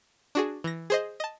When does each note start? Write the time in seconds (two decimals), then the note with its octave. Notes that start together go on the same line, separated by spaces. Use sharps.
0.35 D4 F#4 G#4
0.64 E3 A#6
0.90 G#4 C5 D#5
1.20 D#5 A5